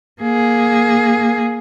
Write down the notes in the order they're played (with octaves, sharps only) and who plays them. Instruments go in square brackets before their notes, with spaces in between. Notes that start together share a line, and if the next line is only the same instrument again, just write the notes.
[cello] A#3 G#4